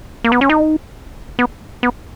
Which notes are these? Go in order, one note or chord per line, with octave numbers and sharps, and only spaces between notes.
A#3
B3
C#4
D#4
B3
B3